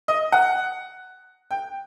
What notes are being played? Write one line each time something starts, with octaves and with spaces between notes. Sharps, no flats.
D#5
F#5
G5